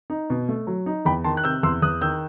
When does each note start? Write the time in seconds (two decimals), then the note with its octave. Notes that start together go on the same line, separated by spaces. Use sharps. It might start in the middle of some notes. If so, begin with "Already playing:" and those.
0.10 D#4
0.30 B2
0.49 A3
0.67 F#3
0.86 D#4
1.05 E2 G5 B5
1.24 D#3 A5 C6
1.37 F#6
1.44 C3 E6 G6
1.63 E2 C6 E6
1.82 E2 D#6 F#6
2.01 D#3 E6 G6